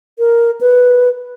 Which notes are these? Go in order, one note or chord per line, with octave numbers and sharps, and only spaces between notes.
A#4
B4